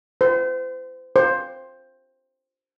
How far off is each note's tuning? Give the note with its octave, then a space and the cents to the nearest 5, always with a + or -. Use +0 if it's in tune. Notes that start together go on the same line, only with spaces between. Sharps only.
C5 -35
C5 +10